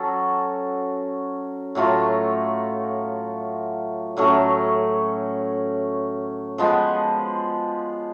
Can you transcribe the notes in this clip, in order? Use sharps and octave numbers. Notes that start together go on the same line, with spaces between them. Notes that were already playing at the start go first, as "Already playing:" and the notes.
Already playing: F#3 C#4 F#4 A4
A2 F#3 A3 F4
A2 F#3 A3 C#4
F3 G#3 B3